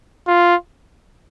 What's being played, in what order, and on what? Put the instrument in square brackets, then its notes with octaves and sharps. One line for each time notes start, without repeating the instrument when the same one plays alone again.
[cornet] F4